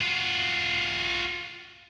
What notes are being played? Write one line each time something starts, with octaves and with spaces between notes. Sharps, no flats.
F4 F#4